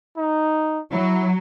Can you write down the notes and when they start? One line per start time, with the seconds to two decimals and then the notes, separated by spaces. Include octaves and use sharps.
0.17 D#4
0.92 F#3 E4